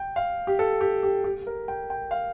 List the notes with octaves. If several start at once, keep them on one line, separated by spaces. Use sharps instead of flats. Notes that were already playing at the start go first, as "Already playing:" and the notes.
Already playing: G5
F5
G4
A4
G4
G4
G4
A#4
G5
G5
F5